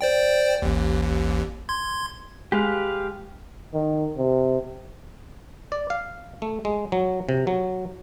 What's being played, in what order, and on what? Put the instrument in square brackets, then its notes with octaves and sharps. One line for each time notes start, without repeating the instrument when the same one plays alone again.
[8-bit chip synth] C5 D5 G5
A1 D#2
C6 G#6
[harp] G#3 [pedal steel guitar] G4 B4 F5
[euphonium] D#3
C3
[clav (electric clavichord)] D5
F5
A3
G#3
F#3
C3
F#3